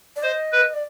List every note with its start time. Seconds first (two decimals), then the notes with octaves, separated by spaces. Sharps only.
0.16 D5
0.23 C5 D#5
0.52 B4
0.74 D5